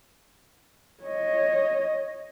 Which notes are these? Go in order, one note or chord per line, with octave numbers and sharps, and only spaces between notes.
C#5 D#5